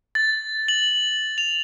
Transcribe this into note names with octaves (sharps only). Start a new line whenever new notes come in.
A6
F#7
F7